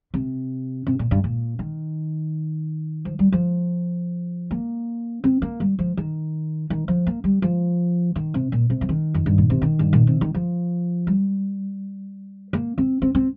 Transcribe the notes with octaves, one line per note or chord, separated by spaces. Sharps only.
C3
C3
A#2
G2
A#2
D#3
F3
G3
F3
A#3
C4
A#3
G3
F3
D#3
D#3
F3
A#3
G3
F3
D#3
C3
A#2
C3
F3
D#3
F2
G2
A#2
C3
D#3
G2
A#2
C3
D#3
F3
G3
A#3
C4
C4
C4